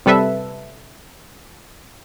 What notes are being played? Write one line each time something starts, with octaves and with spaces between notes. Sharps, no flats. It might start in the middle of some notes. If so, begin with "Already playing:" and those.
C3 G3 A4 B4 E5